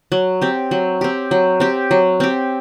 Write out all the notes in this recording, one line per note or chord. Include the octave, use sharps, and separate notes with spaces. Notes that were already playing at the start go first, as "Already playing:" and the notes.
F#3
C4 G4
F#3
C4 G4
F#3
C4 G4
F#3
C4 G4